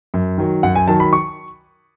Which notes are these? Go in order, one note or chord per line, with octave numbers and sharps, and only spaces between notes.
F#2
D#3 F#3
F#2 F#5
G#5
D#3 F#3 A5
B5
C#6